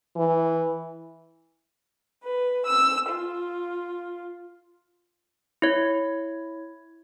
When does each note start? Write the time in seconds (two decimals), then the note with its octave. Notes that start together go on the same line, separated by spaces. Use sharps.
0.16 E3
2.23 B4
2.65 E6
3.08 F4
5.62 E4 C#5